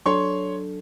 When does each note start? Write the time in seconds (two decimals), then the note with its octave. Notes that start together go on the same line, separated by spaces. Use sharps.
0.06 F#3 D4 A4 C#5 C6 C#6